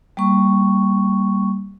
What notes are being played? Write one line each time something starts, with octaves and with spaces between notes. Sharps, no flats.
G3 A#3 C#6